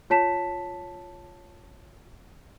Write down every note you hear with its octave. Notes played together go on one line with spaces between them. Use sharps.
F4 C#5 A5 B6 E7